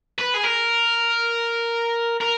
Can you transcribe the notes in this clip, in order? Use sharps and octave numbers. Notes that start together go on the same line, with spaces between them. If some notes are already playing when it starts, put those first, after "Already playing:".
B4
G#4
A#4
A#4